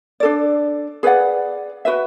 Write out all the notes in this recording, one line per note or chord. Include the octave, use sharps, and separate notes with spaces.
D4 A4 D5
G#4 B4 D5 F#5
F#4 B4 E5